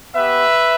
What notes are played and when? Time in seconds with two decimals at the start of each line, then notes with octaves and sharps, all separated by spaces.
0.15 B3 G4 B4 E5